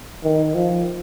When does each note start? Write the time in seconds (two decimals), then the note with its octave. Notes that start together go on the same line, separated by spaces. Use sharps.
0.24 D#3
0.55 F3